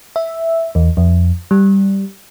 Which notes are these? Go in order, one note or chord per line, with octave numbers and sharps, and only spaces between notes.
E5
E2
F2
G3